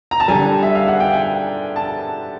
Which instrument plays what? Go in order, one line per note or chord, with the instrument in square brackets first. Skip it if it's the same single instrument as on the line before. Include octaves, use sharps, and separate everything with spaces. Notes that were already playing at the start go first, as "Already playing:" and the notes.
[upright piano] A#5
A5
D3 G3 G#5
E5
F5
F#5
G5
G#5
A5